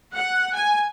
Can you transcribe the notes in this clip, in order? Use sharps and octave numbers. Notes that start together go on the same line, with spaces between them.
F#5
G#5